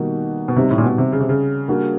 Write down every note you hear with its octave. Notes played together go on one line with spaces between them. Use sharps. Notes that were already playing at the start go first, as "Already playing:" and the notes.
Already playing: B2 D#3 G3 A#3 D#4 F#4
B2
C3 G3 C4 D#4
A2
A#2
B2
C3
C#3
C3
C#3
G3 A#3 D4 F#4